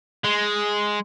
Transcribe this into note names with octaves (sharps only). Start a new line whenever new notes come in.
G#3